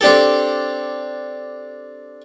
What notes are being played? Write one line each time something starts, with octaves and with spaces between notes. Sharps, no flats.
C4 D4 G4 A4